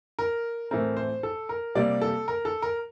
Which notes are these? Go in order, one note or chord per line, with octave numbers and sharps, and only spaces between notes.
A#4
A2 E3 A3 C4 A#4
C5
A4
A#4
C3 G3 A#3 D5
A4
A#4
A4
A#4